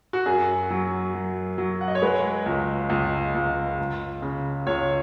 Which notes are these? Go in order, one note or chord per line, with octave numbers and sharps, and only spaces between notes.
F#4
F#2 G#4
F#3
F#3
F#3
F#5
D#5
C#5
G#3 B4
C#2
C#2
C#2
C#2
C#3
C#2 C#5